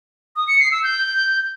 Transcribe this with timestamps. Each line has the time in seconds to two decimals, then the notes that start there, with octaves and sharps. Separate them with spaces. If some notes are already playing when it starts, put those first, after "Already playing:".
0.36 D#6
0.48 C#7
0.60 C7
0.71 E6
0.83 G6